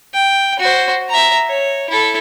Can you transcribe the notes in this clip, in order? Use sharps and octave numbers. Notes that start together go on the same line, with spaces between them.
G5
F#4 C5
E5 A#5
C#5
E4 A4